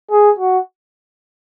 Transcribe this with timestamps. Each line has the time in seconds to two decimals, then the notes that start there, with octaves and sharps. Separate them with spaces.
0.11 G#4
0.39 F#4